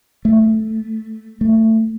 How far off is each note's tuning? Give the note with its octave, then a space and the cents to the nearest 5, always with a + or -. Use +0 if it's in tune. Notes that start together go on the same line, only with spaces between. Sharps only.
A3 +0
A3 +20